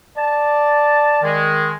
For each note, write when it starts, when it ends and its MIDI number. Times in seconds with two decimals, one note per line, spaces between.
0.17 1.53 74
0.17 1.19 81
1.22 1.72 51
1.22 1.72 56